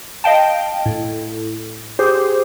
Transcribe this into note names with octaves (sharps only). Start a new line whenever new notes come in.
D#5 F5 G5 A5
A2
G4 G#4 C5